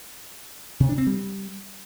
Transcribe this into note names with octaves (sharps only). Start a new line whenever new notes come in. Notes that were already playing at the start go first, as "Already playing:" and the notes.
C3
D4
C4
G3